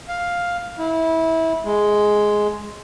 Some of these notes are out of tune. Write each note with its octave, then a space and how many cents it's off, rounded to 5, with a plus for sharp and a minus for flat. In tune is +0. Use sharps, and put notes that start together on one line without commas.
F5 +5
E4 -25
G#3 +5